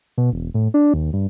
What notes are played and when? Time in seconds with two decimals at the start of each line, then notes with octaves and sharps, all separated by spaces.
0.18 B2
0.33 E1
0.54 A2
0.74 D4
0.94 D#2
1.13 G2